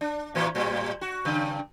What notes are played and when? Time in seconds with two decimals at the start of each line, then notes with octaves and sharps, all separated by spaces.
0.01 D4
0.35 A2 E3 A#3
0.55 A2 G3
1.01 F#4
1.25 G2 C#3